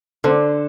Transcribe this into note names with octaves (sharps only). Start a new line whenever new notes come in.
D3 A4 C5